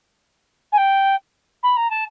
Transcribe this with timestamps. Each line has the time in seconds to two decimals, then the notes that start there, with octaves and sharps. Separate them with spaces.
0.72 G#5
0.77 G5
1.63 B5
1.77 A#5
1.90 A5